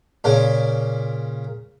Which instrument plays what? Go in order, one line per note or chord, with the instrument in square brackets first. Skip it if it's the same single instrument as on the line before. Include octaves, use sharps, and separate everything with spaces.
[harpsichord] A#2 C#3 C#4